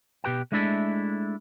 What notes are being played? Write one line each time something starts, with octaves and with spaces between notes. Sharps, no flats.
B2 G4 B4 G5
G#3 A3 D4 E4 A4